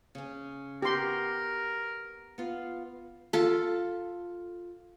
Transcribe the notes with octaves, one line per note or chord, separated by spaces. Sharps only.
C#3 C#4
B3 F#4 G4 A#4 D5 C6
B3 F4 F5
F4 A4